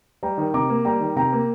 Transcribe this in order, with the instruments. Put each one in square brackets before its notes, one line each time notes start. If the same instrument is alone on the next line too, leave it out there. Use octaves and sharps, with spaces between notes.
[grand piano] G3 [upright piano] G5 A#5
[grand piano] D#3
[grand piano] C3 [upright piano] A#5 D6
[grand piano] A#3
[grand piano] G3 [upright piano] G5 A#5
[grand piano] D#3
[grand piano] C3 [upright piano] G5 A#5
[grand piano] A#3